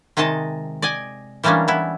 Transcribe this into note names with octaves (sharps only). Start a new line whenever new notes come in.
C3 D#3 G#3 D#5 A5
D5 D#5 G#5
E3 G3 G#3 A#3 C#4 D4
B3 E4